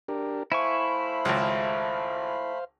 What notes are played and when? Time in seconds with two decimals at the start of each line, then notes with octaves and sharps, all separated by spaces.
0.08 D4 G4 A#4
0.52 A3 E4 C5 F5 G#5 B5 C#6
1.25 G#1 C#2